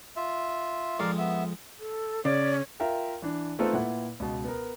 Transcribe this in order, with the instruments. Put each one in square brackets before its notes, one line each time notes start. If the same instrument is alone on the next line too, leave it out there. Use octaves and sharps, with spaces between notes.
[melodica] F4 E5
[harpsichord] F2 F3 G#3 [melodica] A#4 D5 F5
[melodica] B3 E5
[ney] A4
[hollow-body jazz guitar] C#3 [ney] C#5 [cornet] D5
[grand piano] F4 A#4 E5 F5 G5
E3 D4
A3 B3 C4 D#4 F4 A4
A#2 E4 B4 F#5
C#2 B2
B3 A#4